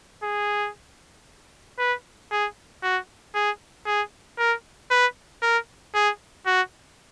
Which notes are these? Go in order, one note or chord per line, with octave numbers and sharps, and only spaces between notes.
G#4
B4
G#4
F#4
G#4
G#4
A#4
B4
A#4
G#4
F#4